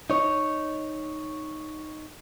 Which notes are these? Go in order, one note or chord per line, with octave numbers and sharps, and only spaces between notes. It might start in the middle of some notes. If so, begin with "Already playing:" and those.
D#4 C#5